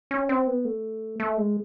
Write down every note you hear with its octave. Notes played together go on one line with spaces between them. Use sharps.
C#4
C4
B3
A3
A3
G#3